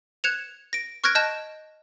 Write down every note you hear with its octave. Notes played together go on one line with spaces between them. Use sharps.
F#6 G#6 C#7 E7 F7
A#6 D7
C#6 F6 F#6 G#6 A#6 D7
D#5 A5 F#6 G6 A#6 E7